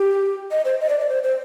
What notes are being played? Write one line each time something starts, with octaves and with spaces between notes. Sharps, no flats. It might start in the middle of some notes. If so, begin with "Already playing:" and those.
Already playing: G4
D#5
C5
D#5
D5
D5
C5
C5